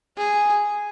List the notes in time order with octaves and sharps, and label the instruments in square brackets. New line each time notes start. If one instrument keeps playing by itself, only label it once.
[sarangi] G#4